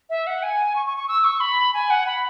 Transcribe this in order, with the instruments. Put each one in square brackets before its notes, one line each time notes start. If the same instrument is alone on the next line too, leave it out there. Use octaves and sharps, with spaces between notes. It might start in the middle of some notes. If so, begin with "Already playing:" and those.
[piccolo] E5
F#5
G#5
C#6
C#6
C#6
E6
C#6
B5
G#5
F#5
B5